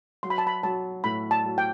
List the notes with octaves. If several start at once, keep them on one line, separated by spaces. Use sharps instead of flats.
F#3 C6
B5
A5
B5
F#3 A5
A2 B5
A5
F#3
G5